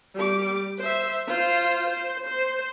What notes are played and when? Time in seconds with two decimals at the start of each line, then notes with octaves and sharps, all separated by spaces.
0.15 G3 D6
0.79 C5 E5
1.27 F4 C5
1.89 C5
2.27 C5